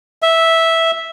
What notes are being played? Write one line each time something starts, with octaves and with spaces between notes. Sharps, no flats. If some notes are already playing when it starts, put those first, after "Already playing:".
E5